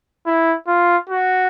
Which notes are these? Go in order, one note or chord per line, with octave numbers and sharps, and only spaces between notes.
E4
F4
F#4